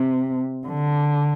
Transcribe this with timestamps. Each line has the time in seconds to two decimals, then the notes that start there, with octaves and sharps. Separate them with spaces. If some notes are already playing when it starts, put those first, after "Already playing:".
Already playing: C3
0.67 D3